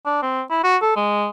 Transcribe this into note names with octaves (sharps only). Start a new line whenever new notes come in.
D4
C4
E4
F#4
A4
G#3